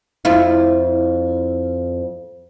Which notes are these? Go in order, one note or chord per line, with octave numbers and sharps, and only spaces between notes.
F2 E4 F4